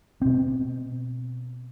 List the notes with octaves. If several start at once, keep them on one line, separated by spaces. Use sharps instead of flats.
B2 C4